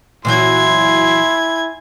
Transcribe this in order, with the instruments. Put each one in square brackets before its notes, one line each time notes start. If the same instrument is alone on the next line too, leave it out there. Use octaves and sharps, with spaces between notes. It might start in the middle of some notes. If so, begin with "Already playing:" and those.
[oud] A#2 E3 F#3 [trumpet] E4 [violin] G#5 G#6 [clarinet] C6